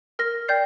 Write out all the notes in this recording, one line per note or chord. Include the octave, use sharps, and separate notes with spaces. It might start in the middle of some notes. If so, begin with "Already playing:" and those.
A#4 F6 A#6
D5 G5 G6 C7